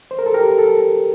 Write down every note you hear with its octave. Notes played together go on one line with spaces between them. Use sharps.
C5
A#4
A4
G4 A#4
A4